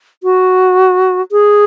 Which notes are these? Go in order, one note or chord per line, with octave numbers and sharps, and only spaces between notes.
F#4
G#4